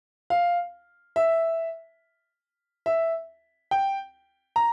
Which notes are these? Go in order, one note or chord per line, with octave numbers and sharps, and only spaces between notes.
F5
E5
E5
G5
A#5